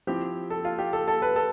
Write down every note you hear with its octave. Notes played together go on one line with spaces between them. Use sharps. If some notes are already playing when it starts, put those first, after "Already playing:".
F3 C4 E4 G4
A4
F4
G4
A4
A4
B4
A4